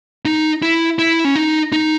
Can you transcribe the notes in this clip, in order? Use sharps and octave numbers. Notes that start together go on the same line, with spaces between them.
D#4
E4
E4
C#4
D#4
D#4